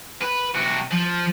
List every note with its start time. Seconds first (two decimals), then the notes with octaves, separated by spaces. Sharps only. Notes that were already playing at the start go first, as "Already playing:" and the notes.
0.22 B4
0.55 C3 F#4
0.91 F3